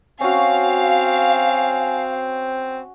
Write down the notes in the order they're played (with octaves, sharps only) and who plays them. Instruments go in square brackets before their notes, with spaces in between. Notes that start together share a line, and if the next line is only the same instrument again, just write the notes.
[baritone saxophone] C4 [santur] C#4 F#4 [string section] F5 [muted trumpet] G#5